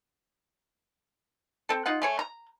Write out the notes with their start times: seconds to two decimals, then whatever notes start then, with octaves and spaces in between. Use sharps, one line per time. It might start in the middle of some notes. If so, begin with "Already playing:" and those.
1.69 C4 A4
1.86 D#4 F4 F#5
2.02 A3 G#4 C#5
2.19 A#5